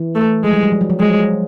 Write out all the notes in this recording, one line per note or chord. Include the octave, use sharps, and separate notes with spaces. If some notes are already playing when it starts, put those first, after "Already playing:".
Already playing: E3
A3
F3 G#3
G3
F#3
F3
F#3
F3
F#3 G#3